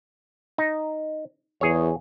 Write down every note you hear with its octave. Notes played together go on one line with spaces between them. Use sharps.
D#4
E2 G#4 C#5